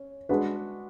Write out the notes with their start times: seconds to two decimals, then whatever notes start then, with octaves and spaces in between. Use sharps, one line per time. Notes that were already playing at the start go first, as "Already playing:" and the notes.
Already playing: C#4
0.29 G#3 D4 F#4 B4